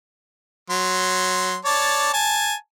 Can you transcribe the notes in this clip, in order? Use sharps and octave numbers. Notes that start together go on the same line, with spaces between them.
F#3 C6
C#5 D5 A5
G#5 A5